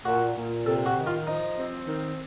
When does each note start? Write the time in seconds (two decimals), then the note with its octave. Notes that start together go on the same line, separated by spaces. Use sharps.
0.05 A#2 F#4
0.36 A#2
0.66 C3 A4
0.86 F#4
0.96 D#3
1.07 F4
1.26 F3 D#4
1.57 C4
1.87 D#3